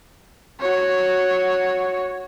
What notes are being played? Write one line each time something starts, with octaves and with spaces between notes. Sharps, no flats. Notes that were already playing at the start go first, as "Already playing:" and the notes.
F#4 C#5